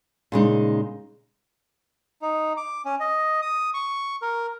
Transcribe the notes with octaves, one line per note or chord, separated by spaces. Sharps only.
A#2 C#3 G#3 D#4
D#4
D6
C#4
D#5
D#6
C#6
A#4